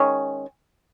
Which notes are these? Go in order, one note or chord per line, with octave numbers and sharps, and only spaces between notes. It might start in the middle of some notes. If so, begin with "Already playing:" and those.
Already playing: D#3 G#3 C#4